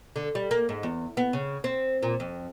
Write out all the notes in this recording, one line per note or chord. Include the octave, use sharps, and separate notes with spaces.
D3
G3
A#3
G#2
E2
B3
C#3
C4
A#2
F2